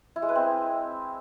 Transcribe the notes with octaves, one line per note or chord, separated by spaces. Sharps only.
E4
G#3
B4
C4